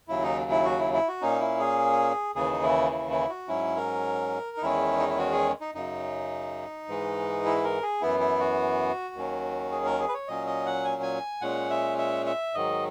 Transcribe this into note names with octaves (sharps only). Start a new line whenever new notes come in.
D#2 C#3 F#3 E4
D#4
E4
F#4
E4
E4
F#4
A#2 A#3 C#4 D#4
E4
G#4
D#2 C#3 E3 G#4
D#4
E4
E4
E4
F#4
G#2 F#3 C#4 E4
A#4
D#4
E2 D#3 G#3 C#4 E4
D#4
E4
F#4
G#4
D#4
F#2 C#3 F#3 D#4
G#2 E3 G#3
E4
A#4
G#4
F#2 E3 B3 E4
E4
F#4
D#2 D#3 F#3 C#4
G#4
A#4
G#4
B4
C#5
A#2 F#3 C#4 D#5
D#5
F#5
G#5
G#5
A#2 G#3 C#4 F#5
E5
E5
E5
G#2 D#3 F#3 D#5